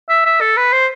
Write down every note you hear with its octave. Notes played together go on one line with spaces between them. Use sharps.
E5
E5
A4
B4
C5